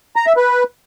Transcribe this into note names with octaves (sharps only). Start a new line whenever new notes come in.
A#5
E5
B4